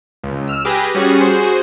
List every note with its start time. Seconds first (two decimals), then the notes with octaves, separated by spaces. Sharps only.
0.24 C#2
0.48 E6 F6
0.65 G4 G#4 B4 A#6
0.95 G3 C#4 F#4 G#4
1.21 F#4 G#4 C5